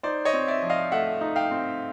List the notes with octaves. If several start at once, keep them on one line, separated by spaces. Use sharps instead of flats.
D#4 C5 D5
C#5 D#5
C4
D5 E5
F3
D#5 F5
A3 E5 F#5
D#4
F5 G5
C4